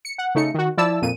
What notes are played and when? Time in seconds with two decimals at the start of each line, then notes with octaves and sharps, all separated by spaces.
0.05 C#7
0.18 F#5
0.35 C#3 A3 D#4 C#7
0.54 D#3 F#4
0.77 F3 E4 D5 A5 E6
1.02 F2 A#2 D#7